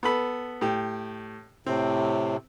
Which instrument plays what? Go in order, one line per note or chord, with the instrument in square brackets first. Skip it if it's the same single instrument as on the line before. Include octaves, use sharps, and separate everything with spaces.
[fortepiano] B3 A4 B5
A2 G4
[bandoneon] A2 C3 [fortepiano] C4